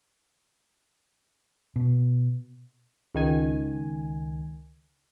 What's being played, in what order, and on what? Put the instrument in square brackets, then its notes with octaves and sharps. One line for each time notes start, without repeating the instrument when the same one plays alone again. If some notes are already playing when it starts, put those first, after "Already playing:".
[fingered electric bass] B2
[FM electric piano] C#2 D#3 G#5